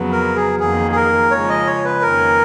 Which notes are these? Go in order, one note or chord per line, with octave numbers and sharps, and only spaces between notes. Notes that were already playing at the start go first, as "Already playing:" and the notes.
Already playing: F2 C#3 F#3 B3
A#4
G#4
F2 D#3 A#3 G#4
G#4
A#4
C#3 F3 G#3 C#5
D#5
C#5
B4
F2 D#3 A#3 C#4 A#4